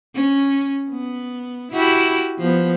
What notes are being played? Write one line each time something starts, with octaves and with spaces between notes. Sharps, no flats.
C#4
B3
E4 F#4 G4
F3 B3